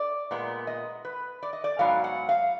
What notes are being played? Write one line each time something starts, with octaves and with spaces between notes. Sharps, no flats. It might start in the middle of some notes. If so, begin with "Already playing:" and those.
Already playing: D5
A#2 G#3 B3
D#5
B4
D5
D#5
D5
G#2 F#3 B3 F5
F#5
F5